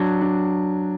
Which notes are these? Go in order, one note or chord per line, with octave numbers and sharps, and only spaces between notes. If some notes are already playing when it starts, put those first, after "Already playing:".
Already playing: F#3 D4
D4